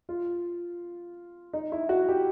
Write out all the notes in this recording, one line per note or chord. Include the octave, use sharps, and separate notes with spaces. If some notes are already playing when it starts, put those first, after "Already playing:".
F4
D#4
E4
F#4
G4